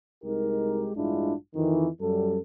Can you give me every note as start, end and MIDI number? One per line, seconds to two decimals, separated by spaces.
0.24 0.91 36
0.24 0.91 56
0.24 0.91 63
0.24 0.91 67
0.24 0.91 70
0.96 1.34 33
0.96 1.34 43
0.96 1.34 56
0.96 1.34 62
0.96 1.34 64
0.96 1.34 65
1.55 1.88 41
1.55 1.88 51
1.55 1.88 52
2.02 2.38 42
2.02 2.38 55
2.02 2.38 69